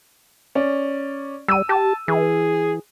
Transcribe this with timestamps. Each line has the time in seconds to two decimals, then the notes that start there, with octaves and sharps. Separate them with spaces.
0.55 C#4 D5
1.48 G3 E6 D#7
1.69 G4 A5
2.08 E3 G#4